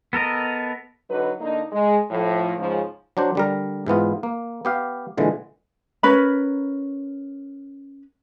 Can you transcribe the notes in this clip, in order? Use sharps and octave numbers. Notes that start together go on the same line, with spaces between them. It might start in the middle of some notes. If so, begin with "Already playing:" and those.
B3 A4 A#4 D#5
D3 F#3 D#4 B4
D3 A#3 D4 D#4
G#3
A2 F3
G#2 C#3 F3
F#3 D4 C5
D3 G3 A#4
G#2 E3 B3 F4
A#3
B3 G4 F5
A#2 D3 E3 G#3
C#4 A#4 B4 B5